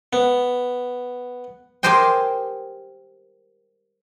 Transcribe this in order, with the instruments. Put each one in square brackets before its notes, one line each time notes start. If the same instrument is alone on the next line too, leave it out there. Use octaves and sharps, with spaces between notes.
[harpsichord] B3
[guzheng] G4 G#4 A#4 C5 D#5 G5